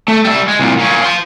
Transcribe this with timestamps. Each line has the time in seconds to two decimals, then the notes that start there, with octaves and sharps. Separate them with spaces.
0.08 A3
0.25 G3 E5
0.48 G#3
0.59 C2 A#2
0.79 A#2 C#4
1.02 F4 C5